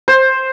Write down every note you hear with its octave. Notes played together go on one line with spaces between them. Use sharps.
C5